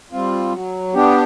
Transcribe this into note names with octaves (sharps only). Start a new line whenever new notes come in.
G3 C4 F4
F#3
B3 D4 G4